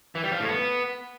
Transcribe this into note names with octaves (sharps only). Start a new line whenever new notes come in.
E3
G3
F3
A2
B3